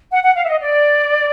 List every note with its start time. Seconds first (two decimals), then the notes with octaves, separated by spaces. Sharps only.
0.12 F#5
0.23 F#5
0.36 F5
0.44 E5
0.48 D#5
0.60 D5